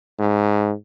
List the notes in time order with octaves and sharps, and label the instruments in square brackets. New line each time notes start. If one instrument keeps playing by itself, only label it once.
[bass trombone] G#2